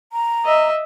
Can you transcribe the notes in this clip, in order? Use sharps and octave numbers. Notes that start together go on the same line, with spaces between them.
A#5
D#5 E5